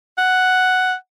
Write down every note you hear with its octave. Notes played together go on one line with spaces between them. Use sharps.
F#5